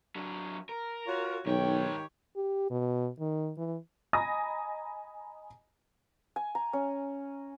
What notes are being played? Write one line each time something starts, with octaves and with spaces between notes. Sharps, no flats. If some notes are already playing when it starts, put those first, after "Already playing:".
F#3 D4
A#4
F4 F#4 C#5
B1 G#2 D#3 G4 C#5 G5
G4
B2
D#3
E3
D#5 G#5 A#5 B5 D#6 A#6
G#5
A#5
C#4